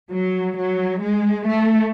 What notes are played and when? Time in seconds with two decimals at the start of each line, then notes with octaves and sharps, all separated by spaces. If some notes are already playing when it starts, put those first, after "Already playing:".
0.11 F#3
0.56 F#3
1.02 G#3
1.47 A3